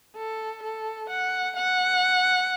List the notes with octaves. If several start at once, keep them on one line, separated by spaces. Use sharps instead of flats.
A4
A4
F#5
F#5